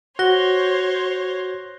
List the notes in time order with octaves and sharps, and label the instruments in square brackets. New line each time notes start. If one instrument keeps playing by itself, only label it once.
[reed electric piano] F#4 [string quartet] C5 C#5 [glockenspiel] F#6 A#6 G7